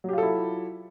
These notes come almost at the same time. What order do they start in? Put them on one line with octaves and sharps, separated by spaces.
F#3 G4 F4 A4 E4